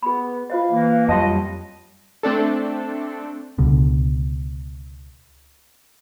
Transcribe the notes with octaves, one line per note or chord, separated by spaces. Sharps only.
B3 G#4 B5
F4 C5 D#5 F5
E3 A#3
F2 F#3 G3 F4 D#5 A5 C6
A3 C4 D4 A4
C#2 B2 D3